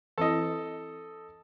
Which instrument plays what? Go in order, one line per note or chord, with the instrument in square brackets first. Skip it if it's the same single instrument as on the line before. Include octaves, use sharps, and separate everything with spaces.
[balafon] E3 C4 E4 [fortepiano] A4 D#5